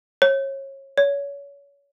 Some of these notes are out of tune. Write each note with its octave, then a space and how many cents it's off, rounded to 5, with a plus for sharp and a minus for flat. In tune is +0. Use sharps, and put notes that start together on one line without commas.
C#5 -30
C#5 +30